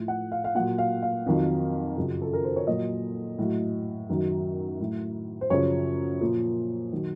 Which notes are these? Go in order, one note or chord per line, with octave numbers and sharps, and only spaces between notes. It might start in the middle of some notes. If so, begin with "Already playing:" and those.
Already playing: A2 F3
F#5
F5
F5
A#2 F#3 F#5
F5
F5
F2 D#3 F#3
F#2 C#3 F3
A4
A#4
C5
C#5
A#2 F#3 D#5
A2 F#3
F#2 D#3 F#3
A2 F#3
C5
F#2 C#3 F3 C#5
A#2 F3
D#3 F#3